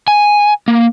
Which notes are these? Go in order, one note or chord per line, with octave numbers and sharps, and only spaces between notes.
G#5
A#3